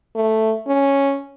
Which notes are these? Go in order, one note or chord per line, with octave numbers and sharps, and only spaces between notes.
A3
C#4